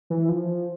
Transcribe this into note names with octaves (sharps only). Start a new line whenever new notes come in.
E3
F3